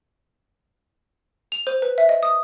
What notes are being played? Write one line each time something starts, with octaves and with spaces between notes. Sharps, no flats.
F7
C5
B4
E5
D#5
D#6